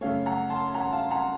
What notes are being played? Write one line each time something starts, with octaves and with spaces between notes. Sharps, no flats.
F#2 C#3 A3 C#5 F5
F#5 A#5
A5 C6
F#5 A#5
F5 A5
F#5 A#5